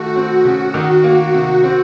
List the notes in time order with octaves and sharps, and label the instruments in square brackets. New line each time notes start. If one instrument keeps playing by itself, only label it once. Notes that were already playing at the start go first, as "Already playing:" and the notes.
Already playing: [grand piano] D#3 A3 [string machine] F#4
[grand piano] C4
C#3
D#3
A#3
C3
C4